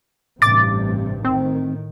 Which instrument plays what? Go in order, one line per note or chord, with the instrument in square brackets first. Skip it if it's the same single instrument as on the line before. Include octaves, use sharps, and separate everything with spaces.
[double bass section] A1 G2 C3 [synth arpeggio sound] D6 A6
[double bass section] A2 D#3 [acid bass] C4